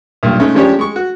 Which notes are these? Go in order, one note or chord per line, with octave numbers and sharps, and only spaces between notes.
B1 G2 A#2
G#3 A3 C#4 D#4
F3 G#3 C#4 D4 G4 C#5
G#3 C#6
F#4